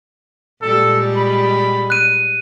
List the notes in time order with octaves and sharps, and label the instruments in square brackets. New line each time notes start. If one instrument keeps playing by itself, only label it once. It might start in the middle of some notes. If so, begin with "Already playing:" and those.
[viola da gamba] A#2 G3 G#3 [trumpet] A4
[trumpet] B5
[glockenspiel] F#6 D#7